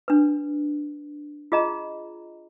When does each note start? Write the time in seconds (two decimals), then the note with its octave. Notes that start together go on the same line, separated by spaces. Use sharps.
0.08 D4 B4
1.52 F4 G#4 D#5 A#5